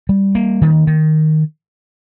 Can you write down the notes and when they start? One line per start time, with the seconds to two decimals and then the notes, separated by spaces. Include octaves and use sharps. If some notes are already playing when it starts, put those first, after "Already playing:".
0.09 G3
0.35 A#3
0.62 D#3
0.87 D#3